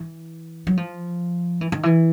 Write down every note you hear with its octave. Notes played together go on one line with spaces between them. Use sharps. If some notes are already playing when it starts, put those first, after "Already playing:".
Already playing: E3
F#3
F3
E3
D#3
E3